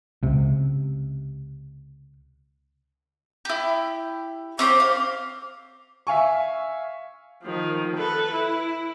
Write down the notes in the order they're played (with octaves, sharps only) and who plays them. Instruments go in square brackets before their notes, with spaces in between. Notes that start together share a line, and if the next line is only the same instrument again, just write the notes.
[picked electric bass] C#2 C3
[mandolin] E4 G4
[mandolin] C4 C#4 C5 [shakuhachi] D6
[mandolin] F5
[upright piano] E5 F5 G#5 C#6
[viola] D#3 F3
A4 B4
E4